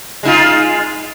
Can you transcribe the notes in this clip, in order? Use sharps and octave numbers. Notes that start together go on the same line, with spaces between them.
G#3 D#4 F4